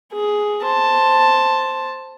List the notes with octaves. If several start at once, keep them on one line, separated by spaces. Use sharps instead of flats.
G#4
C5 A5